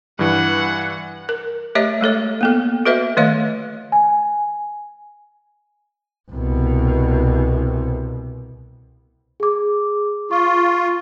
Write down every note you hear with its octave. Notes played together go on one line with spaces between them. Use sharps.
G2 E3 F#5
A#4
A3 G4 C#5 D#5 E5
G#3 A3 A4 C#5
A#3 B3 A4
F#4 A4 B4 D#5 E5
D#3 A3 C#5 D#5 F5
G#5
C2 B2
G#4 D6
F4 C#6